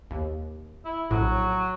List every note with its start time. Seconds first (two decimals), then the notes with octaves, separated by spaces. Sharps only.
0.11 D#2
0.85 E4
1.10 A#1 A2 F#3